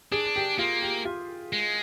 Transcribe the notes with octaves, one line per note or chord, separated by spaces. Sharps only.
D4 G#4
G4
A#3 F4
G4
F4
G#3